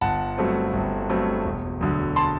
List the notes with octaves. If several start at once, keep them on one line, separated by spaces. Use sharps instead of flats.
G1 F#5 A5
G2 F#3 A3 C4
G1
G2 F#3 A3 C4
E1
D2 D3 F#3
A5 C6